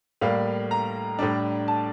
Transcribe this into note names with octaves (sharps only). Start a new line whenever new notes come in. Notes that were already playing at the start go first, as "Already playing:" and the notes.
A2 G3 A#3 F5
A#5
A2 G3 D4
A5